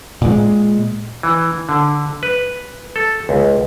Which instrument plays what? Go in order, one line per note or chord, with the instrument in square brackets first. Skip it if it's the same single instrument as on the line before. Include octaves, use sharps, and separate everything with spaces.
[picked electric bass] A#2 G#3
[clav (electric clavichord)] E3
D3
B4
A4
C#2